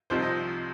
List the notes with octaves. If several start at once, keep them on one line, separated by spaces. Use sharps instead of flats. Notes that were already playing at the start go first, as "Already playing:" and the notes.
C2 C3 F3 D#4 C5
D#5